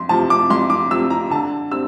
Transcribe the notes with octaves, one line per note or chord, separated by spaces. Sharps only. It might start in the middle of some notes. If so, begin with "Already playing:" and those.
Already playing: F2 C6
C3 F3 A5
D6
F2 C6
D6
C3 F3 E6
A#5
D3 A5
G3 C4 E6